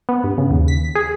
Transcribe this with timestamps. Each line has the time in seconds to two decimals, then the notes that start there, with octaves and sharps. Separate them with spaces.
0.09 B3
0.24 G2
0.38 C#3
0.51 D#2
0.68 B6
0.95 G#4